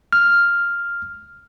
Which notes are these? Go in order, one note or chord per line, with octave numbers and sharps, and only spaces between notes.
F6